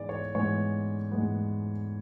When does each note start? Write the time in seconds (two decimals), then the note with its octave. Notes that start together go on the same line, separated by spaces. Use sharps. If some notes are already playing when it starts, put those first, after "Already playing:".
Already playing: G#2 E3 G#3 B3 D5
0.09 C#5
0.34 G#2 E3 G#3 B3 C#5
1.12 G#2 E3 G#3 B3